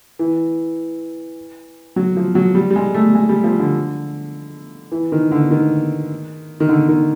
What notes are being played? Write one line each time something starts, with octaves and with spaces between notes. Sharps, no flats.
E3
F#3
F3
F#3
G3
G3
G#3
A3
G#3
G3
F3
D3
E3
D#3
D3
D#3
D#3
D3
D#3